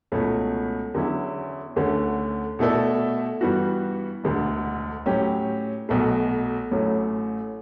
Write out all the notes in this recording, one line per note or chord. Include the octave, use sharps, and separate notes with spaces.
C#2 B2 A3 C#4
E2 D3 F#3 C#4 E4
D2 D3 A3 C#4
B2 A3 E4 A4 D5
G2 E3 G3 B3 F#4
E1 D2 D3
A2 F#3 C#4 G4
B1 B2 A3
A1 A2 F#3 A3 C#4